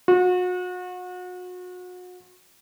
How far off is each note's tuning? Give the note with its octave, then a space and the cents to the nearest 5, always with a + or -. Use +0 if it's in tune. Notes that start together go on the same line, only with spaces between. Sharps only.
F#4 -35